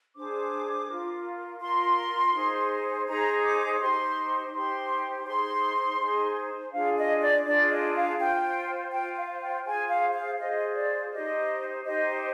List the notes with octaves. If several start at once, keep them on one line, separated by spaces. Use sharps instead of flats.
D4 G#4 C5 D6
F4 A#4
F4 A#4 C6
D#4 G#4 C5
D#4 G#4 C5 A#5
D6
D#4 G4 C5 C6
D#4 G4 C5 C6
D#4 G#4 C5 C6
D#4 G#4 C5
D4 F4 G#4 F5
D#5
D5
D4 F4 G#4 D5
D#5
F5
F4 C5 G5
F4 C5 G5
F5
G5
F4 G#4 C5 G#5
F5
F5
F4 G#4 C5 D#5
D5
D#4 G4 C5 D#5
D#4 G4 C5 D#5